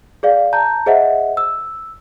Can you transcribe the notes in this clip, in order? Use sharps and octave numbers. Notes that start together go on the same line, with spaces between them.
G#4 D5 F5
A5 A#5 G6
G#4 C5 D#5 E5 F#5
E6